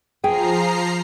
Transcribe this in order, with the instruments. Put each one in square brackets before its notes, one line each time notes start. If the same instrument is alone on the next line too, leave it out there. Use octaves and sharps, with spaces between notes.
[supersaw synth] F3 A#5 C7 [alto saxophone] G#4 [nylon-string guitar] G5